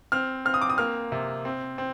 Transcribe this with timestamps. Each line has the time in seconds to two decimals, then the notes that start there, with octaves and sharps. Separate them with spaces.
0.12 C4 F6
0.45 C4 F6
0.54 D#6
0.62 D6
0.70 D#6
0.78 A#3 F6
1.12 C3
1.45 C4
1.78 C4